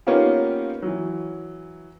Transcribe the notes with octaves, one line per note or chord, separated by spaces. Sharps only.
A#3 B3 C#4 D#4 F4 G4
E3 F#3